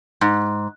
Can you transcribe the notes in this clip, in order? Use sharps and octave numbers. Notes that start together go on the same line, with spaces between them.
G#2